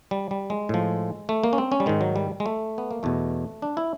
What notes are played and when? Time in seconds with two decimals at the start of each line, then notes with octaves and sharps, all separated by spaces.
0.11 G3
0.31 G3
0.50 G#3
0.69 A2 F3
1.29 A3
1.43 A#3
1.53 C#4
1.58 C4
1.72 C#4
1.80 G3
1.86 G#2 D#3 G#3
2.01 F#3
2.16 G3
2.40 G#3
2.46 A3
2.78 B3
2.91 A#3
3.03 E2 B2 A3
3.62 D4
3.77 E4